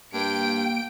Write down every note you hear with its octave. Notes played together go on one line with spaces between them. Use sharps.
G2 A#3 G5 D7